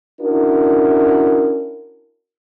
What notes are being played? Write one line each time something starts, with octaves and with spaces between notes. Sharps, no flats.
C#4 D4 E4 F#4 A#4